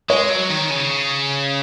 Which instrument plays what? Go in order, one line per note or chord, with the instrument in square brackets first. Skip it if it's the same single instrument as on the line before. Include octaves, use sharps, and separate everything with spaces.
[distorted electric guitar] G#3 [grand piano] C#5
[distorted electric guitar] F#3
D#3
C#3